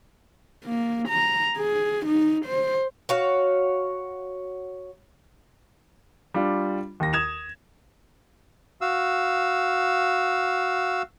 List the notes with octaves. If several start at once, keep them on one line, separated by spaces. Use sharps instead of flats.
A#3
A#5
G#4
D#4
C5
F#4 C#5 F5
G3 D4 F4
D#2 A#6
D#6 G#6 E7 F7
F#4 F5 E6